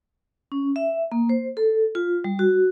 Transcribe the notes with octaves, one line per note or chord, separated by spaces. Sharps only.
C#4
E5
A#3
C5
A4
F4
G3
F#4